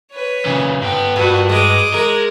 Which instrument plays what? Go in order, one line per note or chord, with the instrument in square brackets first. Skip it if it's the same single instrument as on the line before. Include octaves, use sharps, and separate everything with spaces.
[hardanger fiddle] B4 C#5
[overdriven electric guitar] A#2 C#3
[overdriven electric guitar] G2 B3 [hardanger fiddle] G5
[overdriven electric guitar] G2 [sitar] A#2 [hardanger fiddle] F#4 B4
[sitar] G#3 [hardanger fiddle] D#5 D6
[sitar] G#3 [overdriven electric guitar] A#4